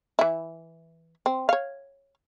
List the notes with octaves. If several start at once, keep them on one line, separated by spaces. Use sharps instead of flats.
E3 E4
C4
C#5 F5